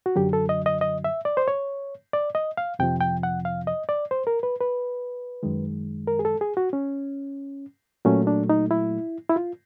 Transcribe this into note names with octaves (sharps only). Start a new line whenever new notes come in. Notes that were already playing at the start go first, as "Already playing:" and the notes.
F#4
F#2 D3 F#3 G4
A4
D#5
D#5
D#5
E5
D5
C5
C#5
D5
D#5
F5
F2 C3 F3 G5
G5
F#5
F5
D#5
D5
C5
A#4
B4
B4
F#2 D#3 G#3
A#4
G#4
A4
G#4
F#4
C#4
A#2 F#3 A3 C#4
D4
D#4
E4
E4
F4